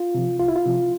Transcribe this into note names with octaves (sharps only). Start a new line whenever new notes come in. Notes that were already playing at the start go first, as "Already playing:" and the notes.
Already playing: F4
C3 F3
C2 F4
E4
F4
C3 F3